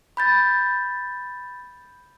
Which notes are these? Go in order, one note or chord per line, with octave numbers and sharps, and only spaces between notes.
B5 G6 A6